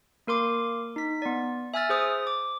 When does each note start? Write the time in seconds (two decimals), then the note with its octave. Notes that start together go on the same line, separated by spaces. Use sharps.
0.27 A#3 A#4 C6 D6
0.96 D#4 B6
1.22 B3 D5
1.74 E5 G#5 E6 F6 A6
1.89 G#4 C5 D#6
2.27 D6